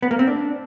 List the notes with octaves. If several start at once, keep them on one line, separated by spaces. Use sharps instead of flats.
B3
A#3
C4
D4